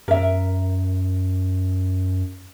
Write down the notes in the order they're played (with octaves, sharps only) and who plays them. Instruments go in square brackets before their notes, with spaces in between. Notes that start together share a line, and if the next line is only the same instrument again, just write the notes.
[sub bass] F#2 [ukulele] A#4 E5